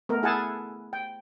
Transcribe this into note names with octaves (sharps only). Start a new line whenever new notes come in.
A3 B3 A#4
E4 G#4 A4 F#5 G#5 A5
G5